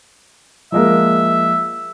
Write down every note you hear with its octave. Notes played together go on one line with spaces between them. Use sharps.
F3 G#3 A#3 E5